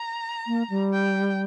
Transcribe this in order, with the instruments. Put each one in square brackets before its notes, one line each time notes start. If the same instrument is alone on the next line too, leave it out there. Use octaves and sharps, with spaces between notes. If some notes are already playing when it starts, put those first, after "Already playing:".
Already playing: [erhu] A#5
[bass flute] A#3
G3
[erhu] G5